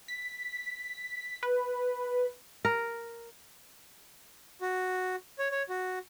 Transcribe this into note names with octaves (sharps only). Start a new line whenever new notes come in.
B6
B4
A#4
F#4
C#5
C#5
F#4